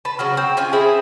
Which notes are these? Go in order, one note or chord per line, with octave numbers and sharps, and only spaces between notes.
B4 A5
C#3 F#3 F#4
C4
C#4 F4 G#5
C4 E4 G#4